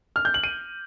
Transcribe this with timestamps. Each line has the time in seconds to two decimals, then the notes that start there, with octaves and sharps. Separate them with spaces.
0.16 F6
0.25 G6
0.34 F#7
0.44 D#7